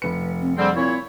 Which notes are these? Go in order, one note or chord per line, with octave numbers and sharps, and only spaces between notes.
F1 B4 C#7
C4
D3 G3 C4 G#4
A#2 C4 E4 C#5